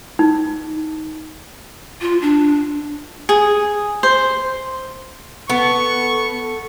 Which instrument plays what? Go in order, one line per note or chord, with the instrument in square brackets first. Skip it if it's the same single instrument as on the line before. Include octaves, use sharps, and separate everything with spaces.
[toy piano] D#4
[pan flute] F4
D4
[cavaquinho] G#4
C5
[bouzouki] B3 [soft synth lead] A4 [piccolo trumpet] C#6